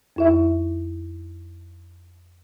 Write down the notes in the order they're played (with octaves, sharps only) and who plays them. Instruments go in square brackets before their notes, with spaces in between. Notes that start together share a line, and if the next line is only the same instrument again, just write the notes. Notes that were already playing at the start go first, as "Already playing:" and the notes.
[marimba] F2 E4 E5